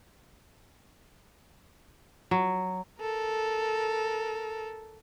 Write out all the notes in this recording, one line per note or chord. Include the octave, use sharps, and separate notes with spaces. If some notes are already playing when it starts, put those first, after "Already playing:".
F#3
A4 A#4